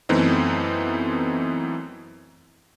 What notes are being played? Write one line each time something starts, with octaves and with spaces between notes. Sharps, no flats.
F#2 E3 A3 B3 C4 D#4